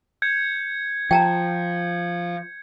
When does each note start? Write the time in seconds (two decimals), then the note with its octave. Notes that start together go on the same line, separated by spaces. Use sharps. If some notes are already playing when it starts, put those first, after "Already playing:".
0.22 G6 G#6 C#7
1.11 F3 G5 A5 A#5